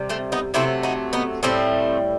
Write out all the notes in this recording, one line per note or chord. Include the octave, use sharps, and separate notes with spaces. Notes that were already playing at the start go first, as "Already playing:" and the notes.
Already playing: C3 G3
A3 C4
B3 D#4
C3 F#3 A3 C4 E4
D#4 F#4
B3 D#4
A2 G3 A3 C4